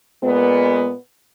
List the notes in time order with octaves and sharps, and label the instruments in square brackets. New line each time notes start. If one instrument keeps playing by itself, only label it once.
[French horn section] A#2 G#3 B3